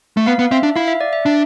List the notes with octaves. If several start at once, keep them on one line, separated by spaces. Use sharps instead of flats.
A3
B3 F5
B3
C4 E5
D4
E4 F5
E5
D5
E5
D4